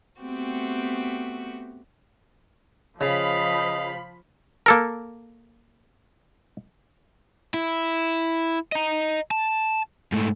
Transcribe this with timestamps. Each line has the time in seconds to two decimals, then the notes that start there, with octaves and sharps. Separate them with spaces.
0.20 A3 B3 C4 F#4 G4
3.01 C#3 F3 D#5 F5 B5
4.66 A#3 A4 A#4
7.54 E4
8.72 D#5 A#5
9.31 A5
10.12 G#2 A3